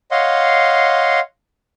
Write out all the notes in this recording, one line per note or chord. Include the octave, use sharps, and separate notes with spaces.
C#5 D#5 F5 F#5 C6